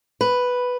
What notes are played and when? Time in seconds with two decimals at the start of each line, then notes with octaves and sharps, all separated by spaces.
0.21 B4